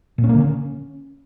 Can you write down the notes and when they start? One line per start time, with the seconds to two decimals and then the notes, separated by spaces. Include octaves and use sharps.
0.18 A#2
0.24 C#4
0.29 A#3
0.35 D3
0.40 C#4